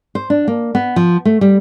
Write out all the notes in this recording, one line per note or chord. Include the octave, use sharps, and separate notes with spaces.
C5
D4
A#3
B3
F3
A3
G3